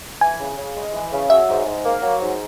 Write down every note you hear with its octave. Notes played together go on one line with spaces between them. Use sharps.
E3 G#5
C#3
C#3
G#3
E3
C#3
F#3 E5
G#2
G#2
A#3
F#3
G#2